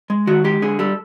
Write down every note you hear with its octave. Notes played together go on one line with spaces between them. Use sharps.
G#3
D#3 F#4
G#3 G4
D3 G#4
G3 A4